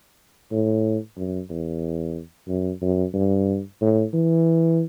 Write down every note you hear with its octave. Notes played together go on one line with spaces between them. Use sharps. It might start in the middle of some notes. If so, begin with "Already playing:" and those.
A2
F#2
E2
F#2
F#2
G2
A2
E3